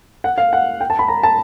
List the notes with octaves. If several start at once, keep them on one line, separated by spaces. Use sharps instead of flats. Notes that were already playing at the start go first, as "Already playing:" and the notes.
F#5
F5
F#5
G5
A5
B5
A#5
A5